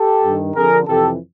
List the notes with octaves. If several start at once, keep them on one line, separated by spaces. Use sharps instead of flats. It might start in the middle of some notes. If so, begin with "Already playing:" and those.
Already playing: G4 A4
G2 D#3
F2 D3 G#4 A#4
F2 C3 E3 G4 A4